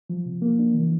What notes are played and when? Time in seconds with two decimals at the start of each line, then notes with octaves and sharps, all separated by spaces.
0.10 F3
0.26 C3
0.42 A#3
0.59 D4
0.74 E3